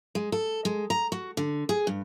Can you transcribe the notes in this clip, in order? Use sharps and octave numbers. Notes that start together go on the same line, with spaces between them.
G#3
A4
G#3
A#5
F#4
D3
G#4
G2